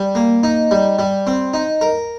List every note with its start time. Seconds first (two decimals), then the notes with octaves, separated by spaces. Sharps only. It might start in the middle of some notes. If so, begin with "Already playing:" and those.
Already playing: G3
0.15 A#3
0.43 D#4
0.71 G3
0.99 G3
1.27 C4
1.54 D#4
1.81 A#4